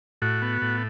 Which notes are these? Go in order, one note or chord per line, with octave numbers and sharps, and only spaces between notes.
A2 F#4
B3
A2